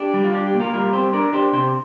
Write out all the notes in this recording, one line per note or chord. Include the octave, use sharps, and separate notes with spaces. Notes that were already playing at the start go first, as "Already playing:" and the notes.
Already playing: D4 G4
G3
F4
D4 G4
G4
A#2
F4 A#4
G3 F4 A#4
C4 G4 C5
D4 A#4 D5
D4 G4 C5
C3 G4 C5